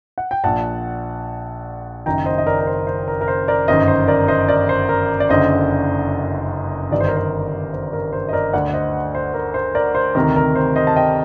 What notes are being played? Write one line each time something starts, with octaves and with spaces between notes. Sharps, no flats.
F#5
G5
A#1 A#2 F#5 A5
F#1 F#2 D#3 G5 A#5
C5 D#5
D#5
A#4 D5
A#4
C5
C5
A#4
A#4
C5
A#4 D5
G1 F#2 D#3 C5 D#5
C5
A#4 D5
C5 D#5
A#4 D5
C5
A#4
D5
F#1 F#2 D3 C5 D#5
G1 G2 D#3 D5
C5
A#4
C5
C5
A#4
C5
D#5
A#4 D5
D2 D3 D5 F#5
D5
C5 D#5
C5
A#4
C5
A#4 D5
C5
D2 C3 D#3 A#4
A#4
C5
C5 D#5
A5
D#5 G5